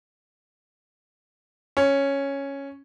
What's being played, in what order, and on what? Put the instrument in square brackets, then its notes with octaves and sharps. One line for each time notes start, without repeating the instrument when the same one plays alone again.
[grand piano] C#4